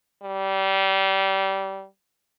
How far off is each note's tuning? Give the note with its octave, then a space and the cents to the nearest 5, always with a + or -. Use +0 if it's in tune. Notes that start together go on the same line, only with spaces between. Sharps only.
G3 -25